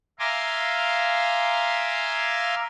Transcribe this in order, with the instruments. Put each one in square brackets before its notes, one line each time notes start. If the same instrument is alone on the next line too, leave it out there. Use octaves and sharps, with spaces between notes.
[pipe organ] E5 F5 G#5 A#5 C6 D6